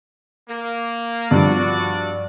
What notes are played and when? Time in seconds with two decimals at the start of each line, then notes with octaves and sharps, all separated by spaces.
0.50 A#3
1.31 G2 F3 F#4 D5